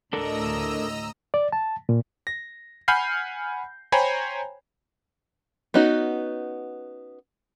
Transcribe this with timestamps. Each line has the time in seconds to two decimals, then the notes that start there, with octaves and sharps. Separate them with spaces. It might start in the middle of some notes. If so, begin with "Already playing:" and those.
0.13 D2 A2 D4 A4 A#4 D#5 A#5 E6
1.34 D5
1.52 A5
1.89 A#2
2.27 A#6
2.88 F#5 G#5 B5 F6 G6 C7
3.92 C5 C#5 G5 G#5 A#5 B5
5.74 B3 C#4 D#4 F#4